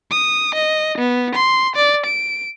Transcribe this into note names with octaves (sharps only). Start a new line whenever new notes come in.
D#6
D#5
B3
C6
D5
D7